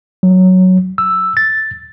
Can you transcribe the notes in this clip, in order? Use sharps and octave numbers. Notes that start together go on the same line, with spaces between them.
F#3
E6
A6